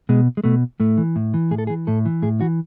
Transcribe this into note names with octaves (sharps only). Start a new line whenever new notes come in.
B2 G#3
G#3
B2 A3
A2 A3
E3
A2
E3
A2 G#4
A4
G#4
E3
A2 A4
E3
A2 G#4
E3 F#4